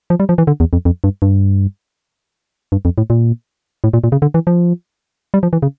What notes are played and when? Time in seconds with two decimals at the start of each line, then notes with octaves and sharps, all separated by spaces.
0.10 F3
0.20 G3
0.29 F3
0.38 E3
0.47 D3
0.60 E2
0.73 F2
0.85 F2
1.04 G2
1.22 G2
2.72 G2
2.85 F2
2.98 A2
3.10 A#2
3.84 A2
3.93 A#2
4.04 A#2
4.12 C#3
4.22 D3
4.34 E3
4.47 F3
5.34 G3
5.43 F3
5.53 E3
5.62 C#3